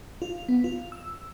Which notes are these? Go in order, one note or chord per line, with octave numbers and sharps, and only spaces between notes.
F4
B3
F4
E6